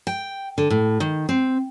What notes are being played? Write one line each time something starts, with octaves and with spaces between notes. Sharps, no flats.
G5
D3
A2
D#3
C4